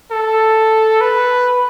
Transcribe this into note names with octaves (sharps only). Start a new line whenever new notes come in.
A4
B4